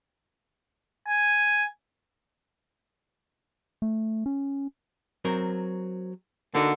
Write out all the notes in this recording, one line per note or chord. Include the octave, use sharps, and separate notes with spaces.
G#5
A3
C#4
F#3 C4 A#4
D3 A#3 D#4 F#4